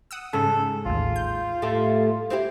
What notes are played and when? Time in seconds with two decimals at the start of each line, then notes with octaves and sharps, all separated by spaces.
0.11 F#5 D#6 E6
0.33 G#2 C#3 C#4 A4
0.86 A1 D#2 F4
1.16 G6
1.62 A2 A3 G4
2.30 C4 E4 G4